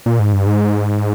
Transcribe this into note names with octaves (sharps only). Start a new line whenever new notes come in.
A#2
G#2
G2
G#2